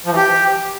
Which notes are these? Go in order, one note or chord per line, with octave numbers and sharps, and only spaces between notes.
F3
E3
G4